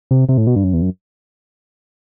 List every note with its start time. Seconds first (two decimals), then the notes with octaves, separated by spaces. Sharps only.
0.11 C3
0.29 C3
0.37 A2
0.47 B2
0.56 G2
0.64 F#2
0.73 E2
0.82 F#2